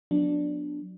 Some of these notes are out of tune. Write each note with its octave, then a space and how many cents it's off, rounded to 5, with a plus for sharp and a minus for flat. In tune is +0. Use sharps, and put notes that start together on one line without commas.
F#3 -25 B3 +0 D4 +0